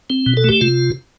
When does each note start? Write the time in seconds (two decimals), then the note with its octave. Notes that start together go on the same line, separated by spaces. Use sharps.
0.10 C4
0.26 B2
0.37 A4
0.44 A3 G4
0.61 C3 F4